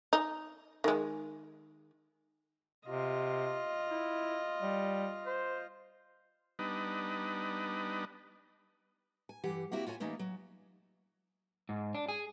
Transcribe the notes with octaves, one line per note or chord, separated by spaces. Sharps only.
D#4
D#3 G#3
C3 F4 D#5
E4
G3
C5
G3 B3 D4 D#4 B4 D#5
G#5
G2 E3 G4 F#5
A#3 C4 E4 F#4 G4
F4 F#4 C#5 G#5
E3 A3 A#3 C#4 D#4
F#3
G#2
D4
G#4